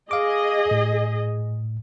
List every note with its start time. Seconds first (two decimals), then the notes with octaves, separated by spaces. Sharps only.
0.11 G#4 D#5 F5 D6
0.71 A2